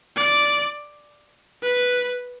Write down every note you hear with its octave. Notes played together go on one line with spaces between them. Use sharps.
D5
B4